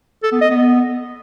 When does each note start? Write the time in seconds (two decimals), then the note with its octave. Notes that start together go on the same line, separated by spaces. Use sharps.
0.23 A4
0.32 B3
0.41 D#5
0.50 B3